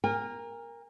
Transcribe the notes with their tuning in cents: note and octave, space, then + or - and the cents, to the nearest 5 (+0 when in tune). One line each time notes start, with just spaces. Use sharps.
A#4 +0 G#5 -40